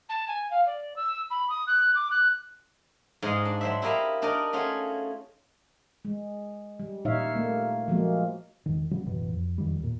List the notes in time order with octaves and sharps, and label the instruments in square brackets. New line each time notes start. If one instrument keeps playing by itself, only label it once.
[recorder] A5
G#5
F5
D5
E6
B5
D#6
F#6
D6
F#6
[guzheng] G#2 G#3 D#5 F5
D4
F#3 C5 E5
E4 G4 A#4 D#5 F5 A#5
D4 D#4 A#4 D5 D#5
A3 C#4 F4 F#4 G#4
[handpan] G#3
G3
A#2 G3 D#4 C#5 E5 F5
A3 A#3
F3 F#3 G#3 A#3
[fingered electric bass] E1 D#3
C#3 F#3 G3
A1 F#2 B2 E3
F2
F2 D#3 G3
D#2 A#2